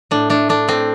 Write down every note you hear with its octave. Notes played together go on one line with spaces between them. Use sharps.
A2 D4
A3 D4
A3 D4
A2 C4